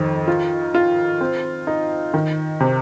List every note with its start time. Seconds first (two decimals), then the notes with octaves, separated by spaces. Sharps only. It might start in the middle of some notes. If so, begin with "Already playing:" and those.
Already playing: F2 D#3
0.28 F4
0.75 F4
1.21 C4
1.67 D#4
2.14 D#3
2.60 C3